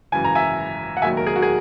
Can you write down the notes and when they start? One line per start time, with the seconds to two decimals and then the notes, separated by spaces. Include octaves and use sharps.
0.12 G#1 F#2 C#3 E3 G#5
0.24 A#5
0.35 E5 G#5
0.97 F#5
1.02 E1 D#2 D#3 F#3 E5 G#5
1.17 A#4
1.27 G#4
1.36 F#4
1.42 G#4